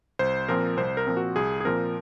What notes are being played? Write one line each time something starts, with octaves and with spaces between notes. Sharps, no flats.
C2 C5
A#2 F3 C4 A#4
C2 C5
A#4
A#2 F3 C4
F#4
C2 G#4
G#4
A#2 F3 C4 A#4